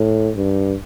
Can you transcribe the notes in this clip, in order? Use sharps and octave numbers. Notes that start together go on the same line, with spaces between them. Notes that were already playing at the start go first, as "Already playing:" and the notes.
Already playing: A2
G2